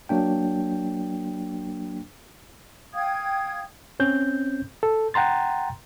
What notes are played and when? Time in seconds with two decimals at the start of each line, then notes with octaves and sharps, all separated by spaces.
0.09 F#3 A#3 D4 G5
2.94 F5 G5 D#6 G#6
4.00 C4 C#4 G6
4.83 A4
5.14 F#5 G5 A#5 C6 A6